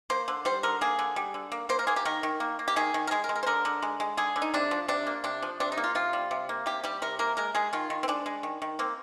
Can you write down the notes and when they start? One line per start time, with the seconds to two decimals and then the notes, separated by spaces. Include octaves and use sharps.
0.10 A#3 C5
0.28 D3
0.45 G3 C5
0.63 D3 A#4
0.81 A#3 G#4
0.99 D3
1.16 G3
1.34 D3
1.52 A#3
1.69 A#3 C5
1.79 A#4
1.87 A#3 G#4
1.96 G4
2.05 D#3 A#4
2.23 D#3
2.40 A#3
2.59 A#3
2.68 G4
2.76 D#3 G#4
2.94 D#3
3.07 A#4
3.11 G#3 G#4
3.24 A#4
3.29 G#3
3.36 A#4
3.43 C5
3.47 D3 A#4
3.65 D3
3.82 G#3
4.00 G#3
4.17 D3 G#4
4.36 D3
4.42 D#4
4.54 C3 D4
4.71 F3
4.88 C3 D4
5.07 A#3
5.24 C3 D4
5.43 F3
5.60 C3 D4
5.72 D#4
5.77 A#3
5.84 F4
5.95 C3 F4
6.13 G3
6.31 C3
6.49 A#3
6.66 C3 G4
6.84 G3 G4
7.02 C3 A#4
7.19 A#3 A#4
7.37 G#3 A#4
7.55 G#3 G#4
7.73 D#3 F4
7.90 D#3
8.03 C4
8.08 G#3 D4
8.26 G#3
8.43 D#3
8.62 D#3
8.79 A#3 C4